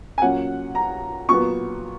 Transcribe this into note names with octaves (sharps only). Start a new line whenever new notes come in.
G#5
A#2 F#3 C#4 F#5
A#5
A#2 F#3 B3 C#6